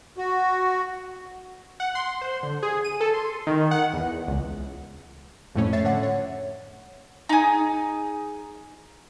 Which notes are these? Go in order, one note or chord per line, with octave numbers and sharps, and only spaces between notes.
F#4
F#5
C6
C5
D3
G#4
D#7
A4
C6
D#3
F#5
E2
C#2
F2 A2 A3 C#4
C#5 E5 A6 C7
D3 C#5 F#5
C#5
D#4 G#4